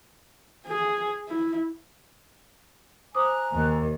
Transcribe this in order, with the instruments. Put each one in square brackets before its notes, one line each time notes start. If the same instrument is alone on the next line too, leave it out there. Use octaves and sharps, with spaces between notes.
[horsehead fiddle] G#4
E4
[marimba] C5 D6 D#6 [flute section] G#5 A#5 F#6
[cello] D#2 [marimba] B2